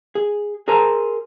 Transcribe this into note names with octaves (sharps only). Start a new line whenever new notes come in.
G#4
G#4 A#4 C5 G#5 A#5